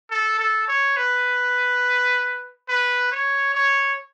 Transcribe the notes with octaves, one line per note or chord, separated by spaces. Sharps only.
A4
A4
C#5
B4
B4
C#5
C#5